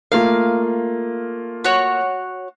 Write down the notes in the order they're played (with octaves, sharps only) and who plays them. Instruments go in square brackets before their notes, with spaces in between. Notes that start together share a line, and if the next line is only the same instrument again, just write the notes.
[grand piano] A3 A#3 F4 [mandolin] F5
[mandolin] F#4 C#5